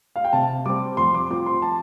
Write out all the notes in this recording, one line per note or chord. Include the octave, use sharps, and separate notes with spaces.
F5
G5
C3 A5
G3 C4 D6
F2 C6
D6
F3 C4 D6
C6
A5